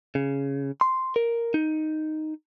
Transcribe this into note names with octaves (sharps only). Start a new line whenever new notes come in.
C#3
C6
A#4
D#4